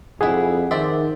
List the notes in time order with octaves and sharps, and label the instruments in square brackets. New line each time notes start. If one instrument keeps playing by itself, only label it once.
[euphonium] F2 [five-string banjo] G3 E4 [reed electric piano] G#4 F#5
[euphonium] D#3 [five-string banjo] C5 D5 E5